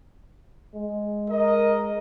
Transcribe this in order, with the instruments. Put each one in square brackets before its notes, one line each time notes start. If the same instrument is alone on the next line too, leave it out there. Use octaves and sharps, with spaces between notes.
[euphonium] G#3
[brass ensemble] A#4 D#5